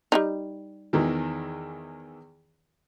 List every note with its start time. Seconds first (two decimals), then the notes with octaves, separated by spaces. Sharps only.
0.12 G3 D4 D#4
0.93 E2 D#3 E3